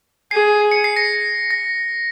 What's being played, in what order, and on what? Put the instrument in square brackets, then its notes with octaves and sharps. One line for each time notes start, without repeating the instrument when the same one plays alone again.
[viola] G#4 [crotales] C7
[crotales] C#7
C7
A#6 C#7
A#6